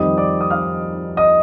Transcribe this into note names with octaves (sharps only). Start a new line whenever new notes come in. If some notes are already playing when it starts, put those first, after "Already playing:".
Already playing: F2 D#3 G3 D#5 D#6
D5 D6
D#6
F5 F6
D#5 D#6